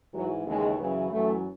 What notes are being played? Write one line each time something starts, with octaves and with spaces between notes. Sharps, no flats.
G#2 E3 F#3
D#2 C#3 E3 G#3
F#2 C#3 E3
F#2 E3 A3